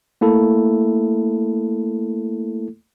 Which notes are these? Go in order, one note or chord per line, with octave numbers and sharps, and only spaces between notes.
A3 A#3 E4 A4